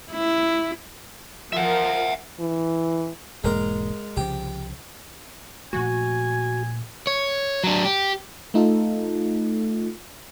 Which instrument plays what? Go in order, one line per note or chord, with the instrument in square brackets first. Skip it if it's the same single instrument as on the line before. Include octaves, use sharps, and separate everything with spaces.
[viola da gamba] E4
[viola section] F3 A#4 [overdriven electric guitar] E5 F#5
[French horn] E3
[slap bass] E1 G#2 A#3 [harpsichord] G#3 A#4
[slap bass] C2 C#3 F3 [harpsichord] G4
[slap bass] A#2 F3 A3 [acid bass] F#4 [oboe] G#5
[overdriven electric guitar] C#5
F#3 D4
G4
[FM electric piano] A3 D#4 F4 A4